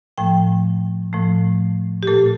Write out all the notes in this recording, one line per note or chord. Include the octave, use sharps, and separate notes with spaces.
A2 F3 A3 G5
A2 F3 A3
G4
A#2 A3 A4